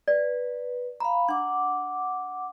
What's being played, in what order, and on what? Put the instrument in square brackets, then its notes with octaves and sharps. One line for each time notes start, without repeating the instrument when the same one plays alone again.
[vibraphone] B4 [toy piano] D5
[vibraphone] F5 B5 [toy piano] A#5
[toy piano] D4 [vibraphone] F#5 D6